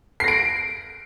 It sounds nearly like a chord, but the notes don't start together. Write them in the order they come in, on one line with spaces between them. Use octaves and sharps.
C7 A#6 D7